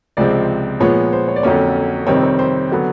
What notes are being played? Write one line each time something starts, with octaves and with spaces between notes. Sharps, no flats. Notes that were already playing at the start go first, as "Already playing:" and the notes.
C#2 C3 F3 G#3 C4 D5
A#2 F3 G#3 B3 C#5
C5
C#5
D5
F2 D3 F#3 A#3 C#4 C#5
F2 C3 D#3 G3 C4 C#5
C#5
C5
D3 F#3 B3